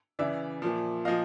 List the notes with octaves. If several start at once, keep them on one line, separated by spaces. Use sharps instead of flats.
C#3 E3 D5 E5
A#2 F3
A#2 F3 D#5 F5